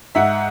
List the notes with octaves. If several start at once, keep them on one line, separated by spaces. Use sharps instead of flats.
G#2 E5 F#5